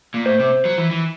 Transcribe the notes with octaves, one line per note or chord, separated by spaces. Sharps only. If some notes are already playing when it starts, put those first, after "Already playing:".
A#2
A2 C5
C3
F#3
E3
E3